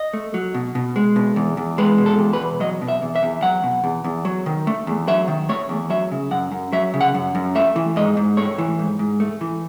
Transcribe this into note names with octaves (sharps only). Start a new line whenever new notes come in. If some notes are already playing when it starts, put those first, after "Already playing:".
Already playing: D#5
A3
F#3
B2
B2
G#3
B2
E2
E2
G#3 B4
B2
A4
E2
B4
E2
F#3 D#5
B2
E5
E2
E5
E2
F#3 F#5
B2
E2
E2
F#3
D#3
A3
E2
F#3 E5
D#3
A3 C#5
E2
F#3 E5
C#3
F#2 F#5
F#2
F#3 E5
C#3
F#5
F#2
F#2
A3 E5
E3
G#2 D#5
G#2
A3 C#5
E3
G#2
G#2
A3
E3